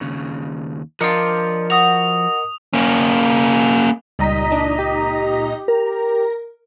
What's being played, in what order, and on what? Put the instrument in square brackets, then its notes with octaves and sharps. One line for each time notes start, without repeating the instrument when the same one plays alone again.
[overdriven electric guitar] D#2 C#3
[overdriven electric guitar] F3 [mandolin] D4 F4 [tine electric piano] A#4 D#5 C#7
[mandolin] F#4 [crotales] D#6 F7
[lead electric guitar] A#3 C#4
[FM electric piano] C#2 A#5 B6 [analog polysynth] A#2 D#4 D#5 [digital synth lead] G3
[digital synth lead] D4
G4
[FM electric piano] A#4 [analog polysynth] A#5